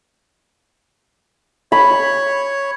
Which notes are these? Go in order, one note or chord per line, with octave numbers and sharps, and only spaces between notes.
C#5 B5